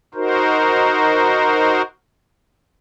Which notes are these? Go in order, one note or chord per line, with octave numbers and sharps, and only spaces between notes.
D#4 F#4 A#4 C5